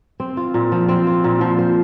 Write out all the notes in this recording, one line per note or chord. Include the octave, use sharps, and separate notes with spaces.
C4
F4
A#2
F3
C4
F4
A#2
F3
C5